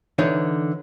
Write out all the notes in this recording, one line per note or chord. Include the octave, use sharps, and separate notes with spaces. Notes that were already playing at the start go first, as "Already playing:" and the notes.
D3 E3 D#4 C#5 D5